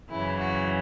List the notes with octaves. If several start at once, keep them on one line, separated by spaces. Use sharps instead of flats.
F#2 C#3 E3 E4
F#4